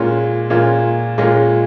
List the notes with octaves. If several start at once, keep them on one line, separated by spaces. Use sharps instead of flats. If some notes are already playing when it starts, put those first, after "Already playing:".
Already playing: A#2 G#3 C#4 F4
A#2 G#3 C#4 F4
A#2 G#3 C#4 F4